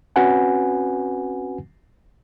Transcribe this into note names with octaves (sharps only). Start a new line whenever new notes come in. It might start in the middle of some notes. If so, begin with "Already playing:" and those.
C4 C#4 F#4 B4 F#5 G#5